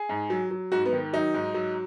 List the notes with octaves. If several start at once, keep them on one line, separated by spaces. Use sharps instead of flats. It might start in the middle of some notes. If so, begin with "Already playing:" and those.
Already playing: G#4
G#2
F#3
F#3
G#2 F#4
B3
D#3
F#3 D#4
G#2
F#3